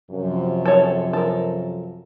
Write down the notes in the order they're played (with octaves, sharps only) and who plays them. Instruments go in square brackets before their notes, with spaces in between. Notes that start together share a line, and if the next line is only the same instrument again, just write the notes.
[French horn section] F#2 C3 F3
[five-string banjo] A4 C#5
A4 A#4